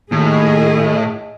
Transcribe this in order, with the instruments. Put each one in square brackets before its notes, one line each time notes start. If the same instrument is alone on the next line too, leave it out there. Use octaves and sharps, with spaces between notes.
[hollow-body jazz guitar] D#2 [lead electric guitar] A2 [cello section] G#4 D#5